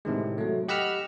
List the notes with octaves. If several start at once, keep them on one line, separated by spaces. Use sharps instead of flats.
A2 C3 D#3 G#3
F#3 A3
G4 D#5 F#5 B5 E6 F6